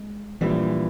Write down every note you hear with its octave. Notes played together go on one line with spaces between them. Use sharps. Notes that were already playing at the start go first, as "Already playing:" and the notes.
Already playing: G#3
A#1 A#2 E3 G3